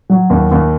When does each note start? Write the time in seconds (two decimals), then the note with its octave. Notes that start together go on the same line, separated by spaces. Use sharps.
0.10 F#3
0.30 D#2
0.51 D#2